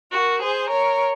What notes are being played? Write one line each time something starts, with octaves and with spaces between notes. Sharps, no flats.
F#4 A#4
G#4 C5
A#4 C#5